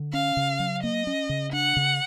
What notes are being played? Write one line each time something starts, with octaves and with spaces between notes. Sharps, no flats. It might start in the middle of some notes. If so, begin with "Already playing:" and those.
Already playing: D3
C#4 F5
C#3
F#3
A#3 D#5
C#4
C#3
D4 F#5
C#3